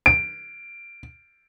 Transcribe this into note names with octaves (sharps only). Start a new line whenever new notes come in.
D7